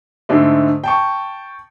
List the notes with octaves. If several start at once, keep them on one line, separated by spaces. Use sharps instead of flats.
G#2 D3 A3
G5 A5 C#6